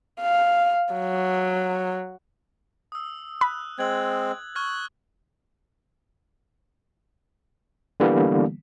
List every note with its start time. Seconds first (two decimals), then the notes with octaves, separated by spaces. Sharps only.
0.21 F5
0.93 F#3
2.92 D#6 E6
3.41 B5 F#6
3.79 G#3 C4 G#6 F#7
4.56 C#6 F6 F#6 G#6
8.00 D3 E3 G3 A#3 B3